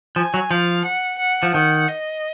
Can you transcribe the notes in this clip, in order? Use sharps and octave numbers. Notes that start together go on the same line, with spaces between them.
F3 G#5
F#3
F3 F5
F#5
F#5
F3
D#3 F#5
D#5